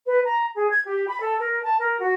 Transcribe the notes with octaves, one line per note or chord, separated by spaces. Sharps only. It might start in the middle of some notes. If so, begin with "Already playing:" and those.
B4
A#5
G#4
G#6
G4
B5
A4
A#4
A5
A#4
F#4